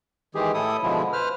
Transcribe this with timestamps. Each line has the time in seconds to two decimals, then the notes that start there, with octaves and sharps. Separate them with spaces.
0.35 D#3 E3 G#3 G4 G#4
0.54 A2 E4 A4 D#6
0.83 B2 D3 F3 G#3 E4
1.13 B4 C5 F6